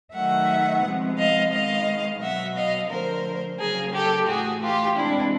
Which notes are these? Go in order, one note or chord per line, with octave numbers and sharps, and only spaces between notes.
D#3 F#3 A3 E5 F#5
C3 F3 G#3 B3
D#5 F5
D#3 G#3 B3 D#5 F5
B2 F#3 B3 E5 F#5
D#5 F5
D3 F3 A3 A#4 C5
C#3 F#3 A#3 G#4 A#4
G4 A4
A2 E3 A3 F#4 G#4
F4 G4
C3 E3 G#3 D4 E4